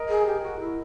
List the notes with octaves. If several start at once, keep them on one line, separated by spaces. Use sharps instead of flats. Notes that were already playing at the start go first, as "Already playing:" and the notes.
Already playing: A#4 D#5
G#4
G4
F#4
E4